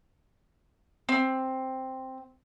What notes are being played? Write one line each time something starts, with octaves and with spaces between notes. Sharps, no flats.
C4